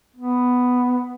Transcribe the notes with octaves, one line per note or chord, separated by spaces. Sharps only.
B3